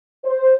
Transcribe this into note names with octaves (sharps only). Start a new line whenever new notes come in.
C5